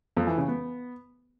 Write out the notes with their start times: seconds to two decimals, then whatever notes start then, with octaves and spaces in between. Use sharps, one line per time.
0.17 F2
0.27 E3
0.38 C#3
0.48 B3